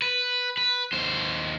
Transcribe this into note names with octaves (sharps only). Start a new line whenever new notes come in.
B4
B4
D#2 C5